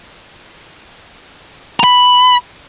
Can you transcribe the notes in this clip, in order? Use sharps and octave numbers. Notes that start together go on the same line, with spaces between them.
A#5 B5